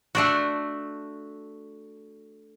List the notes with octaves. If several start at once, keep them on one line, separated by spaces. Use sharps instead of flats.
A3 D4 F#4